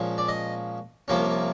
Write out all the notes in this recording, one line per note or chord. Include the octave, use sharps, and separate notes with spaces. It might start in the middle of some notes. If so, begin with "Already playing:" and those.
Already playing: A#2 F3 G#3 C#4
D5
D#5
C2 C3 F3 A#3 C#4